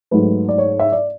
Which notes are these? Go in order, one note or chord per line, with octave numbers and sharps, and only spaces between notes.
G#2 F#3 A3 B4
D5
C#5
E5
D5